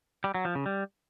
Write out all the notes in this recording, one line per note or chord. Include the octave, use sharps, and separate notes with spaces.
G3
F#3
F3
C#3
G3